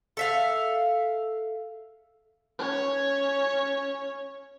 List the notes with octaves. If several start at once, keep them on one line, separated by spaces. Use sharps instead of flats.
A4 E5 F5
C#4 C#5